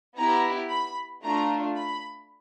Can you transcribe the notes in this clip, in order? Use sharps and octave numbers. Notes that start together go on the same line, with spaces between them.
B3 E4 G4 A#5
B5
A3 D4 F4 A#5
B5